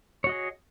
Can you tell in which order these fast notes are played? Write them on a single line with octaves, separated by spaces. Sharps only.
C#5 F#4 D#5 G#4